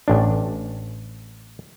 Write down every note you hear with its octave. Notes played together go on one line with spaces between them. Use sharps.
A1 D4